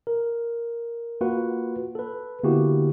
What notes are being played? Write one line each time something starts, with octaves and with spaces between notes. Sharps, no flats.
A#4
A#3 F4 F#4 B4 F#5
A4 B4
D3 A#3 B3 E4 F#4 G4